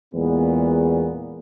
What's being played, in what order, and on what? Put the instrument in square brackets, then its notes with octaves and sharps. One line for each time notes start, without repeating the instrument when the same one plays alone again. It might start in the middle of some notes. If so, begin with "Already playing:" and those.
[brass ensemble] E2 A#2 G#3 B3